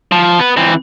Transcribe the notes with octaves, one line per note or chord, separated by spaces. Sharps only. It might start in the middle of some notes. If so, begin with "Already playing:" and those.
F3
B3 B4
E3 C4